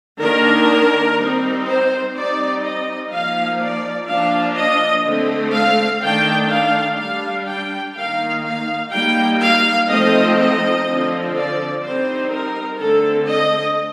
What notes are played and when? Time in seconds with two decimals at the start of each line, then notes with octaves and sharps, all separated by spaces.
0.20 D#3 A#3 D4 A#4
1.18 G3 C4 D#4
1.65 C5
2.14 G3 C4 D#4 D5
2.62 D#5
3.10 F3 A#3 D#4 F5
3.59 D5
4.08 F3 A#3 D4 F5
4.56 D#5
5.05 D3 A3 C4
5.53 F5
6.01 D#3 A3 D4 G5
6.49 F5
6.98 G3 D4 F5
7.46 G5
7.95 D#3 A#3 D#4 F5
8.44 F5
8.92 G3 A#3 D#4 G5
9.40 F5
9.89 F3 A3 C4 D#4 D#5
10.37 D#5
10.86 D3 F3 C4
11.34 D5
11.83 G3 C4 D#4 C5
12.31 A#4
12.79 D3 A3 C4 A4
13.28 D#5